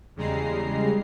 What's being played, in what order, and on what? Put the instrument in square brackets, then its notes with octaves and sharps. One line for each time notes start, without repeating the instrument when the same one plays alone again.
[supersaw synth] E2 C#3 G3 G#3 A#5 C7